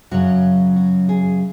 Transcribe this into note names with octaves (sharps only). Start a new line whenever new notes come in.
F#2 C#3 F#3 F#4
F#4
G#4